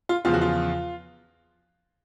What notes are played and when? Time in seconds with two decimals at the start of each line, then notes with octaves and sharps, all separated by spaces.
0.09 F4
0.25 E2 C#3 F3 F4
0.34 F#4
0.41 F4